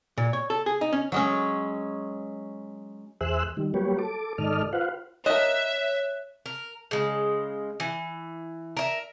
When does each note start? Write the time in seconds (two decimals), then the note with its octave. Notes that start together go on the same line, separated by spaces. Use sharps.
0.18 A#2
0.33 C#5
0.50 A4
0.66 G#4
0.81 D#4
0.93 C#4
1.12 F#3 G#3 C#4
3.21 E2 G#4 C5 E5 E6 F#6
3.57 D#3 G3
3.74 F#3 G3 A#3 G4 B4 C#5
3.99 A4 D6
4.38 G#2 D#3 A4 D5 D#5 F6
4.73 F4 B4 C5 F5 F#5
5.26 A#4 C#5 D#5 E5 F#6
6.46 A#4
6.91 C#3 G#3
7.80 E3
8.77 A#4 E5